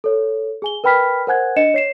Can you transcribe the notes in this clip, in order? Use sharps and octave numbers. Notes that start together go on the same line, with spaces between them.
A4 C#5
G#4 G#5 G7
A#4 B4 G5 B5 F6 B6
A#4 C5 F#5 G#5 F#6 G#6
D4 D#5 C#7 E7
C#5 C7 E7